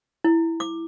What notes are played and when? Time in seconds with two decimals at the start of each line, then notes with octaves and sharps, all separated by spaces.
0.24 E4
0.60 D6